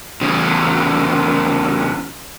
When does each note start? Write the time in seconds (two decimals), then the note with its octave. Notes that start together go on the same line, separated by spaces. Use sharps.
0.21 E2 C#3